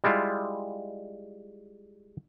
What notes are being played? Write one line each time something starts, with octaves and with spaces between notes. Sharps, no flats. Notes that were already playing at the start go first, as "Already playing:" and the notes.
G3 G#3 E4 F4